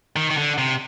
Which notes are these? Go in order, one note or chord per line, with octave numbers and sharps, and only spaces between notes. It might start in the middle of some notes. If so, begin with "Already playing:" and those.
D#3
D#3
D3
C3